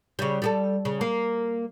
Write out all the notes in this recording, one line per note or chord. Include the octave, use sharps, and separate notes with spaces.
C#3 G3
G3 G4 A4
C#3
A#3